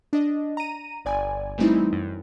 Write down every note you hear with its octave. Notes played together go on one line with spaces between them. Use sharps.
D4 D#5
A#5 D#7
G1 D5 G#5
E3 G3 A3 C4 D#4 E4
F#2